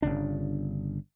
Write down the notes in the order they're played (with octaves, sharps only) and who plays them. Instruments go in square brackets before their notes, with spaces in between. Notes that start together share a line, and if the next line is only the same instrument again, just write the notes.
[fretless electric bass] G1 C#2 C#3 D4